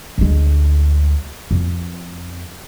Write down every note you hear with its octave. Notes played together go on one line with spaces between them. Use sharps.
D2 G#3
F2